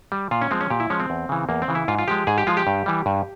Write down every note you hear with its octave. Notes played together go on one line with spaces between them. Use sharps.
G3
A#2 F4
C#4
F3 G#3 C4
C#4
A#2 G4
E4
F3 G#3 C#4
C4
E2
C#3 E3
E2 A#3
C4
C#3 E3
E4
G#2 F4
F4
F3 G#3 G4
G#2 G#4
G4
F3 G#3 F4
G4
G2
E3 G3
G2